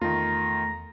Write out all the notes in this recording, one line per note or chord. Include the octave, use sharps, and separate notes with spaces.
E2 D#3 A3 F4 A#5